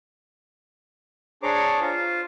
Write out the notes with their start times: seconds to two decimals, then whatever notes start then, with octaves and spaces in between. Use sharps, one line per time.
1.43 D4 G#4 C5 C#5 A#5 D6
1.81 F4 C5